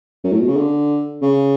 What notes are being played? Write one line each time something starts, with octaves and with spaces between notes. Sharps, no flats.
F#2
A2
B2
C#3
D3
C#3